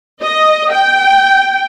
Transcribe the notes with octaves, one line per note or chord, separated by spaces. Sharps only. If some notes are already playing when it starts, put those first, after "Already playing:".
D#5
G5